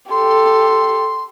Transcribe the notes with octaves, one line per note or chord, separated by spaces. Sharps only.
G4 A4 C6